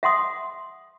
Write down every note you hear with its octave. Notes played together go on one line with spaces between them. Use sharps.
E5 F#5 C6 D#6